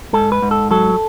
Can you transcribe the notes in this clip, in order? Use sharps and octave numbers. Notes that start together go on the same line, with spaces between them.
G#2 A4
B4
G#2
A4
F#3 A4